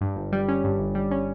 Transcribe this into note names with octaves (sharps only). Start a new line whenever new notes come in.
G2
G1
G3
C#4
G2
G1
G3
C#4